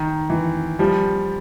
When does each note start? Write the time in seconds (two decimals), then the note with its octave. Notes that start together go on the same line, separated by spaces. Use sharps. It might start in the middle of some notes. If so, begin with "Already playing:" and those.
Already playing: D#3
0.30 E3
0.79 F3 G3